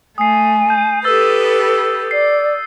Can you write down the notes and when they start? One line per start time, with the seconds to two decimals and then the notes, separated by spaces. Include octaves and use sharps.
0.18 A3 G#5 D#6 C7
0.69 G6 D#7
1.04 G4 A4 B4 D#6 E6 A6
1.78 D#6
2.11 D5 C7